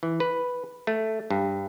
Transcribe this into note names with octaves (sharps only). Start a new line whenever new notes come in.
E3
B4
A3
G2